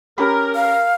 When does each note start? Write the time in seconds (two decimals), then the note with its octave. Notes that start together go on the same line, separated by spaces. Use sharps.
0.18 C#4 G4 A#4 B5
0.55 F5